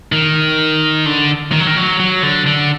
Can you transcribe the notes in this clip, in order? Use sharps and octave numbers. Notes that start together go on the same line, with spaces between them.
D#3
D3
D#3
F#3
D#3
F#3
F#3
D3
D3